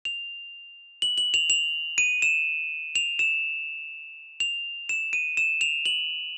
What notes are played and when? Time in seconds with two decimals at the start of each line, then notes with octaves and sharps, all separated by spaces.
0.05 F7
1.02 F#7
1.18 F#7
1.34 F7
1.50 F7
1.98 D#7
2.22 E7
2.95 F7
3.19 E7
4.40 F7
4.89 E7
5.13 D#7
5.37 E7
5.61 F7
5.86 F#7